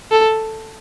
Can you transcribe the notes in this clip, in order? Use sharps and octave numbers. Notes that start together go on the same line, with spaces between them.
A4